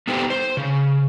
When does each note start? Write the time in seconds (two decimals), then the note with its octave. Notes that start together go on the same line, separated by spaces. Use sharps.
0.08 B3 D#4 G4 A4 C5
0.30 C5
0.57 C#3